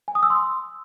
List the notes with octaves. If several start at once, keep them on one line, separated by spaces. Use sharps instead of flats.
G#5
D#6
E6
C6